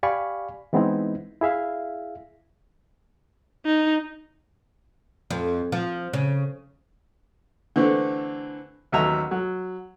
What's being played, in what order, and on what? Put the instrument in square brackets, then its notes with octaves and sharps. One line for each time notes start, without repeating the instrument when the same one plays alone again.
[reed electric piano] G4 D5 F5 G#5 B5 C#6
E3 G#3 B3 C4 D#4 E4
E4 G#4 E5 F5
[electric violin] D#4
[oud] F2
F3
C#3
[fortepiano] D3 E3 A3 C4
A1 D#2 F#3 E5 A#5
F#3